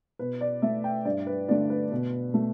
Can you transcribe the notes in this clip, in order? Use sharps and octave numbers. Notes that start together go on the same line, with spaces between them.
B2 B4
D5
A3 E5
G5
G2 D5
B4
D3 A3 D5
B4
B2
A3